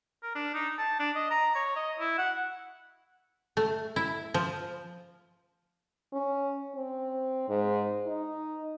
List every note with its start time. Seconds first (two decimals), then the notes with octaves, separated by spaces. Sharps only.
0.23 A#4
0.35 D4
0.54 D#4
0.78 A5
1.00 D4
1.15 D#5
1.30 A#5
1.55 C#5
1.76 D#5
1.99 E4
2.18 F#5
3.57 A3
3.96 E4
4.34 F3
6.13 C#4
6.75 C4
7.49 G#2
8.06 D#4